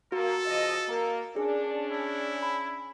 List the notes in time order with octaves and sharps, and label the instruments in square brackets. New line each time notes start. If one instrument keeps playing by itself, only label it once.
[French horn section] A#3 [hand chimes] F#4 [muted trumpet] A4
[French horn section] C#3 F3 D#5
A#3
[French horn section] C#4 D4 [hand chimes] G#4
[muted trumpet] E4
[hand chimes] B5